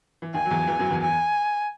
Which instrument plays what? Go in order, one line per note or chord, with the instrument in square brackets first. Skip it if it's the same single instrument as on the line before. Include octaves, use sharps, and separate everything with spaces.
[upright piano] E3
[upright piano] D#2 D#3 [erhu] G#5
[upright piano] F#3
E2 E3
E2 E3
F#2 F#3
E2 E3
[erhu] G#5